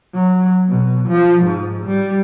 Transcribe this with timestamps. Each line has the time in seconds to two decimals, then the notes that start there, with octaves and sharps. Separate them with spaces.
0.14 F#3
0.69 B2
1.08 F3
1.44 G#2
1.86 G3